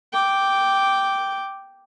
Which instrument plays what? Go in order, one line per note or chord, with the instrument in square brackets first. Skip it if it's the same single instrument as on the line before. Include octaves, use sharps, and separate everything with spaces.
[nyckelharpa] G5 D6